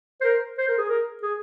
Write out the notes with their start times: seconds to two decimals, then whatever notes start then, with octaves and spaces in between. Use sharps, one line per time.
0.21 C5
0.24 A#4
0.58 C5
0.68 A#4
0.78 G#4
0.89 A#4
1.22 G#4